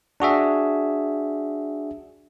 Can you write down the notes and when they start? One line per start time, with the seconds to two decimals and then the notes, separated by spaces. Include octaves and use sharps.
0.20 D4 F#4 G#4 E5